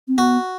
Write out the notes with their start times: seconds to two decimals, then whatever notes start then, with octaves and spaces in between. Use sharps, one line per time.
0.08 C4
0.17 B3 F#4